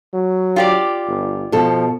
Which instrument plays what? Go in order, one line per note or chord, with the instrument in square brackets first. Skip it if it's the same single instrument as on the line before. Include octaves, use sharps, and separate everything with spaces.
[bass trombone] F#3
[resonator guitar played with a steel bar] F4 G4 D5
[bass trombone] G1
[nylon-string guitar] B2 A4 [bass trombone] F3